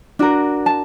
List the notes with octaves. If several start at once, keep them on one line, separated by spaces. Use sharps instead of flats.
D4 F#4 A#4
A5